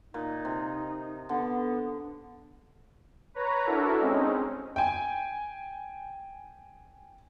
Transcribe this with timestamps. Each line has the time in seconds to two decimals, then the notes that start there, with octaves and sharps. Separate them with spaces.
0.14 A#2 D#4
0.45 C3
1.29 D3 B3
3.34 B4 C#5 A#5
3.65 D4 E4 F#4 A4 A#4
4.01 G#3 C4 C#4 D#4
4.76 G5 G#5